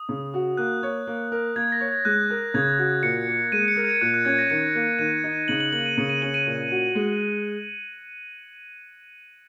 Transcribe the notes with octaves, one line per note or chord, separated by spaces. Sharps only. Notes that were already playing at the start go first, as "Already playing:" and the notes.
Already playing: D#6
C#3
F#4
A#3 F#6
C#5
A#3
A#4
A#3 G#6
A#6
C#5
G#6
G#3 F#6
A#4
C#3 G#6
F#4
A#2 C#7
A#3
G#3 D#7
C#7
A#4
G#6
A#2 F#6
F#6
C#4 G#6
A#6
D#3 C#7
A#3
D#3 D#7
D#4
C#3 F#7
F#7
A#3 F#7
D#7
C#3 C#7
D#7
C#4 F#7
D#7
A#2
F#4
G#3